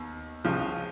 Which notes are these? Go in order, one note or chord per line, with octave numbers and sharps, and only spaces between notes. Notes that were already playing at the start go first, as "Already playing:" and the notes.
Already playing: D#2 B3
C#2 C#3 F3